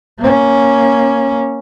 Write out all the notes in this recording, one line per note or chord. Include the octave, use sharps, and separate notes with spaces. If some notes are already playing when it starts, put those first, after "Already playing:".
A#3 C#4